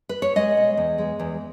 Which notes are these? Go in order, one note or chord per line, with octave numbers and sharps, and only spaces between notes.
B4
C#5
G#3 D#5
B2
E2
G#3
E2